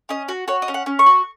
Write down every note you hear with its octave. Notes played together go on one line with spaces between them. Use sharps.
C#4 D#5
F#4
F#4 C#5
D#5
C#4
F#5
C#4
C#6
F#4